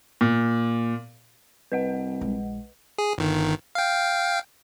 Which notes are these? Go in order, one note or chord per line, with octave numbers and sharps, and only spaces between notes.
A#2
C2 B4 D#5 F#5
A#1 G#3
G#4
G1 D#3
F5 G5